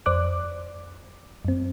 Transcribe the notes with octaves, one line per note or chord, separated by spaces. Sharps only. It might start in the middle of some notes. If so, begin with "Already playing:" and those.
F2 C5 D5 D6 F#6
F#2 C4